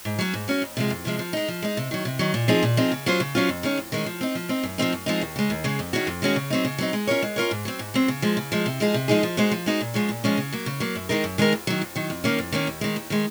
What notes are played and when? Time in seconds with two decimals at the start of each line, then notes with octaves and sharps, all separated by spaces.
0.05 G#2
0.19 F#3 C#4 F#4
0.34 G#2
0.48 F#3 C#4 F#4
0.62 F2
0.77 C3 F3 G#3
0.90 F2
1.05 C3 F3 G#3
1.19 F3
1.33 G#3 D#4
1.48 F3
1.62 G#3 D#4
1.77 C3
1.91 D#3 F#3
2.05 C3
2.19 D#3 F#3
2.34 A#2
2.48 F3 C4 D#4 G#4
2.63 A#2
2.77 F3 C4 D#4 G#4
2.92 C#3
3.06 F#3 C#4 F4 C5
3.20 C#3
3.35 F#3 C#4 F4 C5
3.49 F2
3.63 D#3 G#3 C#4
3.77 F2
3.92 D#3 G#3 C#4
4.06 F3
4.21 C4 D#4
4.35 F3
4.49 C4 D#4
4.63 F#2
4.78 F3 G#3 C4 D#4
4.93 F#2
5.06 F3 G#3 C4 D#4
5.21 D#2
5.36 C#3 G#3
5.50 D#2
5.64 C#3 G#3
5.79 F2
5.93 D#3 G#3 C#4 F#4
6.07 F2
6.22 D#3 G#3 C#4 F#4
6.36 C#3
6.50 F#3 C4 D#4
6.65 C#3
6.78 F#3 C4 D#4
6.93 G#3
7.07 C#4 F4 A#4 C#5
7.22 G#3
7.36 C#4 F4 A#4 C#5
7.51 G#2
7.65 F#3 C4
7.79 G#2
7.94 F#3 C4
8.08 C#3
8.22 F3 G#3
8.37 C#3
8.52 F3 G#3
8.66 C3
8.80 F3 G#3 D#4 G#4
8.94 C3
9.08 F3 G#3 D#4 G#4
9.23 F3
9.37 G#3 D#4 F#4 C5
9.51 F3
9.66 G#3 D#4 F#4 C5
9.81 A#2
9.94 F3 G#3 C#4
10.09 A#2
10.24 F3 G#3 C#4
10.37 C#3
10.52 F#3 A#3
10.66 C#3
10.80 F#3 A#3
10.96 F#2
11.09 D#3 G#3 D#4 A#4
11.24 F#2
11.38 D#3 G#3 D#4 A#4
11.53 F2
11.67 D#3 F#3
11.81 F2
11.96 D#3 F#3
12.10 F2
12.24 D#3 A#3 C#4
12.39 F2
12.52 D#3 A#3 C#4
12.67 D#2
12.81 D#3 G#3
12.96 D#2
13.10 D#3 G#3